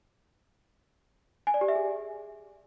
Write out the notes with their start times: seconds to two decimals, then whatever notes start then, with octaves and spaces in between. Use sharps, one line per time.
1.47 G#5
1.54 D5
1.61 G4
1.68 E5
1.76 G#4